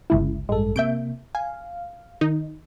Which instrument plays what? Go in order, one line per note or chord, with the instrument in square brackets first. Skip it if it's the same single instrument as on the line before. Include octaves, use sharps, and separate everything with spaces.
[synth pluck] G1 C#2 E4
[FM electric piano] A1 G2 A4 [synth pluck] G#3
[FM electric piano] C3 A#3 [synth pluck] E5 G6 D7
[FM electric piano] F5 [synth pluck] G#5
[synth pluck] D#3 D#4